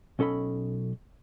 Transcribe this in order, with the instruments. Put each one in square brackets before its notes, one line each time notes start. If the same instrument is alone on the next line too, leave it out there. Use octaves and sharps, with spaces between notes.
[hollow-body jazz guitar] B1 C#4 A4 D#5 B5